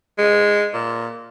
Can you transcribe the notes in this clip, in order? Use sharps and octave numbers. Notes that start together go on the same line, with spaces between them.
G#3
A#2